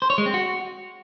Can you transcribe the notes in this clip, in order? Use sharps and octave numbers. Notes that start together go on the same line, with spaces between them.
C5
C#5
G#3
C4
F#4